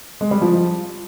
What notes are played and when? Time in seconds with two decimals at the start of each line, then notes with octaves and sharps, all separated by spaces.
0.21 G#3
0.31 G3
0.42 F3